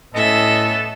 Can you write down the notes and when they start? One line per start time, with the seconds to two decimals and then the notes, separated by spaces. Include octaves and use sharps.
0.14 A2 B3 C#4 A4 D#5 E5